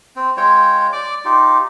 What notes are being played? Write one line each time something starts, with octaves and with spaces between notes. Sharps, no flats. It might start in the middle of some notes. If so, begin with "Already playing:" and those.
C4
G#3 F4 C#5 G5
D5 D6
D#4 F4 G4